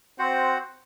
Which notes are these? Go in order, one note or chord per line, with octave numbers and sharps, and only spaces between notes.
C4 F#4 C5 F#5